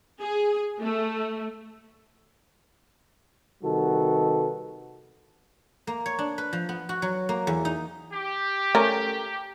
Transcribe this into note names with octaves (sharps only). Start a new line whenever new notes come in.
G#4
A3
C3 D#3 G3 F#4 A4 B4
A#3
C#5
D4
B4
F3
B3
F#4
F#3
A#3
E2
D#4
G4
A3 C#4 A#4